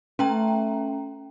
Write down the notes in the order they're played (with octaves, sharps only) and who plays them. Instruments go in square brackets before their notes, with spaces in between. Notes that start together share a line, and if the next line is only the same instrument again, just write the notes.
[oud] A3 [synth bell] C#4 G5 A#5